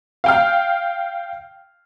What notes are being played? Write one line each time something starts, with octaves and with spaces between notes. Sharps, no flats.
F5 G5 F6